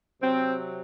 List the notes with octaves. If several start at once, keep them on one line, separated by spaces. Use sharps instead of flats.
C3 F#3 C4